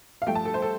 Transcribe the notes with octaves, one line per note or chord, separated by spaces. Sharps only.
F5
G2 F3 A3 G5
A5
A4
C5
A4